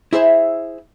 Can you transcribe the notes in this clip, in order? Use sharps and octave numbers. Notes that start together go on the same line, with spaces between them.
E4 G#4 C5 E5